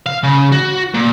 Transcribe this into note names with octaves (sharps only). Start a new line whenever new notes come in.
F5
C#3
F#4
A#2